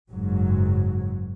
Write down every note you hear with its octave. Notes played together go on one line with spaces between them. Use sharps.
F#1 G#2 F#3